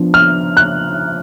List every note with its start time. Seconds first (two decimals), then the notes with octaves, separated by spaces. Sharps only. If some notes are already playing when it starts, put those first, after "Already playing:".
Already playing: F3 B3 D4
0.14 F6
0.57 F#6